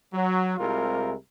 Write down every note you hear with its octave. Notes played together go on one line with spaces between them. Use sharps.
F#3
C2 C3 G#3 E4 F4 A#4